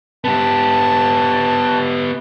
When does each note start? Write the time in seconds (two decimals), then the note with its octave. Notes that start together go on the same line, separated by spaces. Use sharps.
0.24 B3 G4 A5